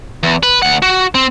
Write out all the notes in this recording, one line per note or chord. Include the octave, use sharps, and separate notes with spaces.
E2
B4
D2 F#5
F#4
C4